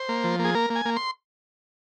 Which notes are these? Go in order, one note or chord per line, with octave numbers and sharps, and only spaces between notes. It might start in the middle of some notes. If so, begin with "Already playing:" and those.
Already playing: C5
A#3
F3
A#3
G#4
A#3 A#4
A#3
G#5
A#3
C6